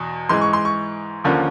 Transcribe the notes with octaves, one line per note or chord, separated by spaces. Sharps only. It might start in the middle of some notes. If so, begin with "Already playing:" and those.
Already playing: E2 B2
G#2 E3 G#3 C6
C#6
C6
C#6
D#2 D3 F3 A#3 C#4